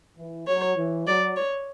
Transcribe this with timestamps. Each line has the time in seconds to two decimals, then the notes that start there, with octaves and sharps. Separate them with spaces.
0.18 E3
0.47 F#3 C#5
0.77 E3
1.06 F#3 D5
1.37 C#5